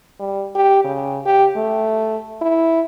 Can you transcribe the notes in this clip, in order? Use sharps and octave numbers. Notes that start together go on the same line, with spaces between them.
G3
G4
C#3
G4
A3
E4